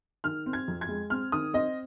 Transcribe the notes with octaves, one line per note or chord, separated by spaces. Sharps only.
D#3 F6
C4
G#6
F2
G#6
G#3
C4 F6
D#3 D#6
C4 D#5